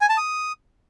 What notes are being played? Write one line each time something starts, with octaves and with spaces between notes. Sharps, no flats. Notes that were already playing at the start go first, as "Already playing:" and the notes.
G#5
A5
D#6